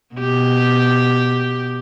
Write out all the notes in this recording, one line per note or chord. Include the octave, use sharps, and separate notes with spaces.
B2 G4